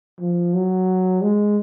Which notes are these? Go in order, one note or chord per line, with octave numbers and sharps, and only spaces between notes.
F3
F#3
G#3